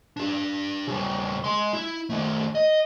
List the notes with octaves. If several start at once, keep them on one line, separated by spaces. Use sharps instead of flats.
D4 G4
C#3 G3
G#3 C6
E4
D#3 A3
D#5